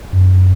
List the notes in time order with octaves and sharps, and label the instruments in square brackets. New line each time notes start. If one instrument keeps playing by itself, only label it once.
[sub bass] F#2